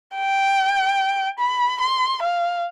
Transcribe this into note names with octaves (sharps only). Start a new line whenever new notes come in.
G5
B5
C6
F5